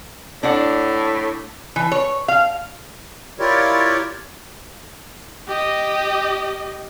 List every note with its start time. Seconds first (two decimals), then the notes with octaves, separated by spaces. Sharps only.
0.43 A2 D4 D5 F#5
1.76 E3
1.92 C#5
2.28 F5
3.40 E4 F4 G4 A#4 C#5 D5
5.48 G4 D#5